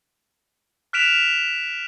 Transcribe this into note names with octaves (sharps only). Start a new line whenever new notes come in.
F6 F#6 B6 D7 E7 F7